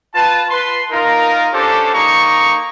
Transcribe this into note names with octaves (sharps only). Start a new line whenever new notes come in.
F4 B4 A5
B4 C6
D#4 F4 A#4
C#4 D4 G4 A4 C5
A#3 D#4 A#5 C#6